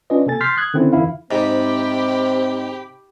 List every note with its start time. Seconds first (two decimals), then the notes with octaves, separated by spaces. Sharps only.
0.10 C#4 D4 F4 B4 D5 D#5
0.26 C3 A#3 A4 G#5 A6
0.41 C6 F6 G6 A6 B6 C7
0.57 D#6 F#6 G#6
0.74 D3 D#3 C4 C#4 E4
0.92 F2 D3 E3 E4 F5
1.31 G#2 C3 C4 G4 B5